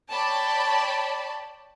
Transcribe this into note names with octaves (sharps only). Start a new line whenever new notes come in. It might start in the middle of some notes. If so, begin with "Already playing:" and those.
C#5 D5 G5 A5 B5